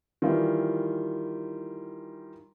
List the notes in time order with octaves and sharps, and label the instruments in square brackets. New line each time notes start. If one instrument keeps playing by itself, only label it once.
[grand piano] D#3 E3 G3 F4